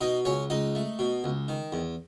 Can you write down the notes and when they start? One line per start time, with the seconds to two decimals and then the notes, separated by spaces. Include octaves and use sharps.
0.01 B2 D#4 D#5
0.25 C#2 C#4 C#5
0.50 C#2 D#4 D#5
0.75 A3
0.99 B2
1.24 C#2
1.48 D#3
1.72 E2